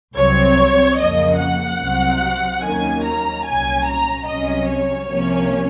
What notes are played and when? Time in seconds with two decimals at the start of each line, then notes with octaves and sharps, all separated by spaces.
0.15 C2 C3 F#3 C4 C#5
0.98 F2 C#3 F3 A#3 D#5
1.39 F#5
1.80 C2 C3 F#3 C4
2.62 D#2 D#3 F#3 A#3 C#4 G#5
3.04 A#5
3.45 C2 A#2 F#3 C#4 G#5
3.86 A#5
4.27 C2 C3 F#3 C#4 D#5
4.69 C#5
5.09 C2 C3 F3 A#3 C#4